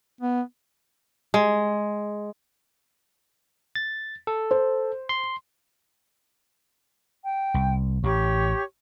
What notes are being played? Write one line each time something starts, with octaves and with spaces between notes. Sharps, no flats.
B3
G#3
A6
A4
C5
C6
G5
C2
A1 G4 C#5 C#6